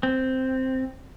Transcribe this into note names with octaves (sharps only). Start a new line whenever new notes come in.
C4